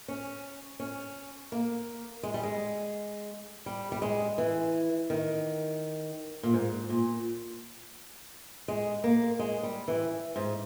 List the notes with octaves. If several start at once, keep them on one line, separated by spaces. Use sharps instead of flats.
C#4
C#4
A#3
G#3
G3
G#3
G3
G3
G#3
E3
D#3
A#2
G#2
A#2
G#3
A#3
G#3
G3
E3
G#2